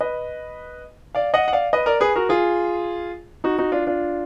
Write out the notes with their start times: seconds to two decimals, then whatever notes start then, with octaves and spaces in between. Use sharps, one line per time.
0.01 B4 D#5
1.15 D5 F5
1.34 D#5 F#5
1.48 F#5
1.53 D5 F5
1.73 B4 D#5
1.86 A#4 D5
2.00 G#4 B4
2.16 F#4 A#4
2.29 F4 G#4
3.44 D#4 F#4
3.58 D#4 F#4
3.72 D4 F4
3.87 D4 F4